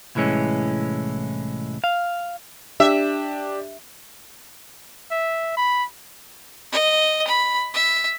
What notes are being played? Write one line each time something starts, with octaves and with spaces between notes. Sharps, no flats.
C2 A2 E3 G#3 C#4
F5
D4 G4 E5
E5
B5
D#5
B5
E5